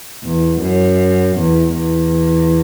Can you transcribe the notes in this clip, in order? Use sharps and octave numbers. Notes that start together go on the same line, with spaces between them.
E2
F#2
E2
E2